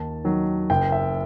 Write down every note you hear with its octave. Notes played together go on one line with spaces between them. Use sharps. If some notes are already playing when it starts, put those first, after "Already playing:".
Already playing: D#2 A5
D#3 F#3
F#1 G5
E5